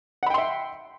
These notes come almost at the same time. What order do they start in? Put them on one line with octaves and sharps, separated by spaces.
F#5 B5 G5 C6 E5